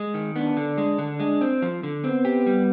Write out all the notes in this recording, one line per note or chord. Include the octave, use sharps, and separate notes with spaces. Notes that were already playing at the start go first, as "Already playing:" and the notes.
Already playing: G#3
D#3
B3 D4
D3
G#3
D3
G#3
C4
F3
D3
B3 C4
G4
G3